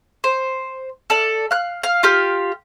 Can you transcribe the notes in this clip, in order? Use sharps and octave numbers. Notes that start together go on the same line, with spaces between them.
C5
A4 D5
F5 F#6
F5
F4 G4 F5